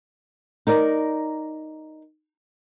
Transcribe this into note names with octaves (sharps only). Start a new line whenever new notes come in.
D#4 A#4 D5